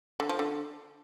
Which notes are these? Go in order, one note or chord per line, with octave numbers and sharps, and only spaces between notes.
D3
F3
D3